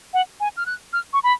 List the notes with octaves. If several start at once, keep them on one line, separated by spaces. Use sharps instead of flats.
F#5
G#5
F6
F#6
F6
C#6
B5